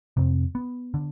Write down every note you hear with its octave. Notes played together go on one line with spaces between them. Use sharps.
F2 C3 C4
B3
D3